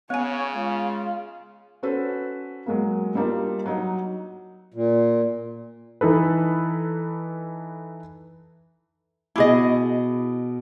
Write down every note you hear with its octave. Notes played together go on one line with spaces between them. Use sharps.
C#3 B3 C#5 G#5
G#3 F4 F5
C#4 F#4 A4 B4 C5
F#3 G#3 A#3
G3 A#3 D4 D#4 F4
F#3 D#4
A#2
E3 D#4 A4 B4
B2 E4 G#4 D#5 D6